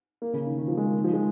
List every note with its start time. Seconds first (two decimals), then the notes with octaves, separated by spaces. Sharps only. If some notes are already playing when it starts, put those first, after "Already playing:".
0.22 A#3
0.33 C#3
0.47 D#3
0.58 D#3
0.68 F3
0.77 G#3
0.86 A#3
0.98 D#3
1.04 F3
1.13 G#3